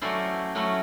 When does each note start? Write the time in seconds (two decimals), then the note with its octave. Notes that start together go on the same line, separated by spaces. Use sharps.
0.02 F#3 A3 C#4 E4 C5 D5
0.55 F#3 A3 C#4 E4